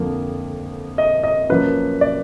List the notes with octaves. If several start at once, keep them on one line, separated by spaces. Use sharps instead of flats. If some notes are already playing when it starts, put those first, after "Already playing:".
Already playing: F2 D3 F3 A#3
D#5
D#5
F#2 F3 A#3 B4
D5